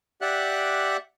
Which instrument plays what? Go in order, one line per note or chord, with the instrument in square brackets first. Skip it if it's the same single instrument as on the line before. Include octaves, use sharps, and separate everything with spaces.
[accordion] G4 D5 E5 F#5 F#6